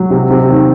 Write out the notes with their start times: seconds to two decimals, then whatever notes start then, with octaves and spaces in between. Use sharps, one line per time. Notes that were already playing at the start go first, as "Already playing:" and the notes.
Already playing: F#3
0.10 C3
0.30 C3
0.50 D#3